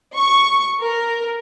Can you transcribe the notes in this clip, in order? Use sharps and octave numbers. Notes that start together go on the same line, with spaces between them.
C#6
A#4